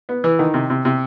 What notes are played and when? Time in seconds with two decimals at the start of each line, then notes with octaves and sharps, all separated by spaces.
0.09 B3
0.24 E3
0.39 D#3
0.54 C3
0.70 C3
0.85 C3